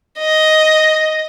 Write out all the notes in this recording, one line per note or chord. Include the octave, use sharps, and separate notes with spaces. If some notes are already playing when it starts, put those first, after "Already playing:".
D#5